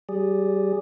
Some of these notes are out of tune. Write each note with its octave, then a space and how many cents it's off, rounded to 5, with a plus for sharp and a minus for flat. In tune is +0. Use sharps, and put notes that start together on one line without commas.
G3 -30 G#4 -10 D5 +0